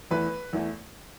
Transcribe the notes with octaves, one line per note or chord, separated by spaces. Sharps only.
E2 E3 A3 B4
E2 E3 A3